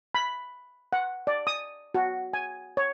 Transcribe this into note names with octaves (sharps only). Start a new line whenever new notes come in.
B5
F#5
D5
D#6
F#4
G#5
C#5